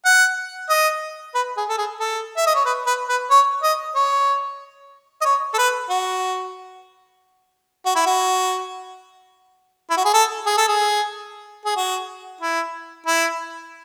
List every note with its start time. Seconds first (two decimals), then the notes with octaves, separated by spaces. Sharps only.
0.05 F#5
0.69 D#5
1.35 B4
1.57 G#4
1.69 A4
1.78 G#4
2.00 A4
2.37 E5
2.46 D#5
2.55 C#5
2.66 B4
2.87 B4
3.09 B4
3.30 C#5
3.63 D#5
3.96 C#5
5.21 D#5
5.25 C#5
5.54 A4
5.58 B4
5.90 F#4
7.86 F#4
7.95 E4
8.06 F#4
9.90 E4
9.97 F#4
10.05 G#4
10.14 A4
10.46 G#4
10.57 A4
10.68 G#4
11.65 G#4
11.76 F#4
12.41 E4
13.06 E4